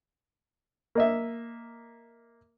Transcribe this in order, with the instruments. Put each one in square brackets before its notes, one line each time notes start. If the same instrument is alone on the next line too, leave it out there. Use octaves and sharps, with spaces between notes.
[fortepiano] A#3 D#5 E5